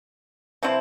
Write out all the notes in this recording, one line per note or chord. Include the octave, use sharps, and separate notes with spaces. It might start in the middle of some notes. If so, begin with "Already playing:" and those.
C3 F3 C4 E4